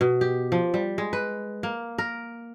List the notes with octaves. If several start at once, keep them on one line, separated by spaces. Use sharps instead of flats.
B2
G4
F3
G3
G#3
B4
A#3
A#4